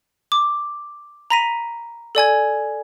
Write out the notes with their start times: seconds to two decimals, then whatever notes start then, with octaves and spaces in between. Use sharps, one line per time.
0.32 D6
1.30 A#5 B5 A#6 B6 D#7
2.15 A4 D5 G#5 G#6